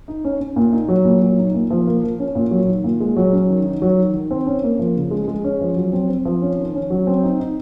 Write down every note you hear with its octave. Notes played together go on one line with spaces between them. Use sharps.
D#4
C#4
C#4
A#2
D#4
F#3
A#2
F#3
D#4
A#2
F3
A#3
F3
C#4
A#2
F#3
D#3
A#2
G#3
F#3
C#4
D#3
D#4
F#3
D#3
D#3
C4
C#4
A#3
F3
C#3
G#3
G#3
C#4
F3
F#3
C4
C4
F3
C#4
D#3
C#4
F#3
C4
D#4
D#4